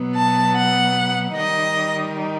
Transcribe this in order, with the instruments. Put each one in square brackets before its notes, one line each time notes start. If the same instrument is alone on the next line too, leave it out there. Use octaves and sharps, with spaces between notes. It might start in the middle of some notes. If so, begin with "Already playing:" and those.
Already playing: [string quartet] B2 F#3 B3
A5
F#5
D#3 G3 D#4 D#5